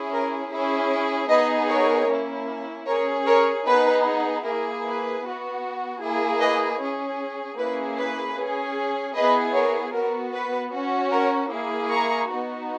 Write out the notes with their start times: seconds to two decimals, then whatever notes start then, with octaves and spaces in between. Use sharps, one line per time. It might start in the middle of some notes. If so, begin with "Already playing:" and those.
Already playing: C#4 E4 G#4
0.12 A#4
0.51 C#4 E4 G#4
1.29 B3 D#4 G#4 B4 D#5
1.68 A#4 C#5
2.09 A#3 C#4 E4
2.86 C#4 G#4 A#4 C#5
3.26 A#4 C#5
3.65 B3 D#4 G#4 B4
4.43 A#3 E4 G#4 A#4
4.83 B4
5.23 B3 F#4
6.01 A#3 E4 G#4
6.40 B4 D#5
6.80 C#4 G#4
7.58 A#3 C#4 E4 G#4 B4
7.98 B4
8.36 C#4 G#4
9.15 B3 E4 G#4 B4 D#5
9.54 A#4 C#5
9.93 B3 F#4 A#4
10.33 B4
10.72 C#4 F#4
11.11 A#4 C#5
11.50 A#3 E4 G#4
11.90 A#5 C#6
12.29 B3 D#4 F#4